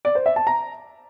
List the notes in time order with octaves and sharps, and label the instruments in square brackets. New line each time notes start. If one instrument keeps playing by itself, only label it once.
[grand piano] D5
C5
E5
A5
A#5